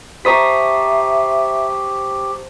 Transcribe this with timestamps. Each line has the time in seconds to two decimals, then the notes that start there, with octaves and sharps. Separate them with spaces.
0.25 G4 C5 E5 A5 A#5 C#6 D#6 B6